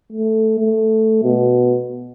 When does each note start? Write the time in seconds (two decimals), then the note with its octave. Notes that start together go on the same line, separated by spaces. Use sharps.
0.12 A3
0.60 A3
1.23 B2